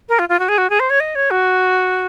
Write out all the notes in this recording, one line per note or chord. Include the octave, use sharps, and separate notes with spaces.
A#4
F4
F4
F#4
G#4
F#4
G#4
C5
C#5
D#5
C#5
F#4